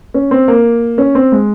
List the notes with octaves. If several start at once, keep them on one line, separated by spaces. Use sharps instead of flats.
C#4
C4
A#3
C#4
C4
G#3